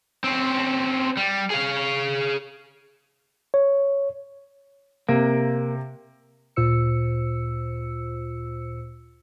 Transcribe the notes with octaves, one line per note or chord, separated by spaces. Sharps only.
C4 C#4
G3
G#4 F5
C#5
C3 A#3
D2 A#2 F4 C5 E6 C#7